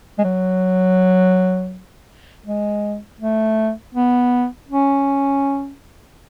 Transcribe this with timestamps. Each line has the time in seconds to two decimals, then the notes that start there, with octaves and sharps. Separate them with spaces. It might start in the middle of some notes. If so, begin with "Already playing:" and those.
0.19 G#3
0.24 F#3
2.46 G#3
3.21 A3
3.95 B3
4.69 C#4